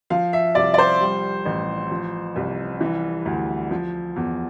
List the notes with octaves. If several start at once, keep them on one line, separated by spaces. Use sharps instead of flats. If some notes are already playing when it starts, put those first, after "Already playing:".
F3 F5
E5
C2 D5
D5
C5
G3
A1
F3
C2
E3
D2
F3
E2